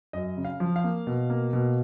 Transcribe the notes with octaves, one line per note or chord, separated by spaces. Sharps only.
F#2 D#5
C#3
F5
F3
F5
A#3
B2
A#3
B2